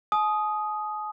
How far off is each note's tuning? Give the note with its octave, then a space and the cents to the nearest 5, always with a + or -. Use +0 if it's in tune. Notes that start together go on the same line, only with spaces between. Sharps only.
G#5 +45 D#6 +0